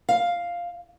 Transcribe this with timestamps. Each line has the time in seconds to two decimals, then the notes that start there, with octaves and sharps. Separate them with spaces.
0.09 F5